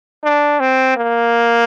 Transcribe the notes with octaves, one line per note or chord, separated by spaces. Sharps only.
D4
C4
A#3